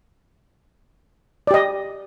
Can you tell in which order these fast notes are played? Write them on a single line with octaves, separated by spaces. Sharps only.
D5 G4 D#5